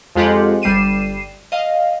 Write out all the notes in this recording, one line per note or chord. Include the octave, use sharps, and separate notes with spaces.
F2 G#3 F4 G4 F#5
G1 G3 C7 D#7 E7
D#5 F5